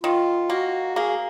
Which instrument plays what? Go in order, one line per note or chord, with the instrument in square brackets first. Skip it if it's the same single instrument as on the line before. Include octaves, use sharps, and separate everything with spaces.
[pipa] D#3 [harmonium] F4
[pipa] A#3 [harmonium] F#4
[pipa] A#3 [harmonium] G#4